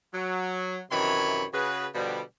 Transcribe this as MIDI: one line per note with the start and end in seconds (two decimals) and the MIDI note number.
0.13 0.79 54
0.91 1.46 42
0.91 1.46 48
0.91 1.46 51
0.91 1.46 52
0.91 1.46 73
0.91 1.46 83
1.53 1.87 49
1.53 1.87 66
1.53 1.87 68
1.53 1.87 71
1.95 2.21 47
1.95 2.21 50
1.95 2.21 53
1.95 2.21 55